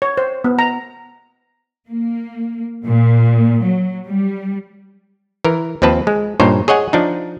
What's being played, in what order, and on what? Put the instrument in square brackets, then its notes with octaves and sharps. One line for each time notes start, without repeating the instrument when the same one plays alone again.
[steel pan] C#5
C5
B3
A#5
[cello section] A#3
A#2
F#3
G3
[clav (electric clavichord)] E3 A#4
D#2 F3 C4 B4 A5
G#3
G2 A#2 D#4 C5 C#5
G#4 C#5 D#5 F#5 G#5
F3 D4 D#4